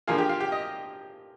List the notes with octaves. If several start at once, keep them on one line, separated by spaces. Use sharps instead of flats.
D3 F3 A#3 F4 G#4
G4
F4
G4
D#5